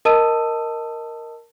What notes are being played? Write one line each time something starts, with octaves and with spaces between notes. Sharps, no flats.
A#4 D#5 A5 D#6 E6 D#7